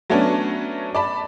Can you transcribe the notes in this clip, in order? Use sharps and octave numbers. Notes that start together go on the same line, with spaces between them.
F#3 A3 B3 C#4 D4
D5 A5 B5